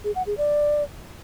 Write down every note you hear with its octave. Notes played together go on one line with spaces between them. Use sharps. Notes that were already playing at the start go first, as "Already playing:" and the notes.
G#4
F#5
G#4
D5